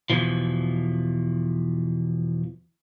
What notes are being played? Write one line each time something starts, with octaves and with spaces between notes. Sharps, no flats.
E2 G#2 B2 E3 F3